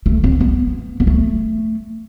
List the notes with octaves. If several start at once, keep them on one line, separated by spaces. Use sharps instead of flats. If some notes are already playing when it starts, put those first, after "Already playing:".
A3
C4
B3
B3
A3